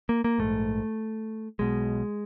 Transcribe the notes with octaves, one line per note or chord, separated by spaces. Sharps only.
A#3
A#3
A#1 G#2 A3
B1 B2 G#3